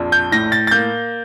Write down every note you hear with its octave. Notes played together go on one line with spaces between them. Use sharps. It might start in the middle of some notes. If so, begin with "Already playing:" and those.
Already playing: A#1 F2
G6
A2 A#6
A6
A6
A#3 G6